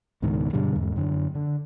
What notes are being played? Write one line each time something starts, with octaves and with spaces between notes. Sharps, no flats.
C#2 G#2 B2 D#3
G2 B2 D3 G3
E2 G#2
F#2 D3
D3